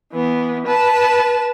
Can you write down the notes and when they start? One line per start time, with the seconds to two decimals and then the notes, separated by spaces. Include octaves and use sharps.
0.13 E3 B3
0.66 B4 A5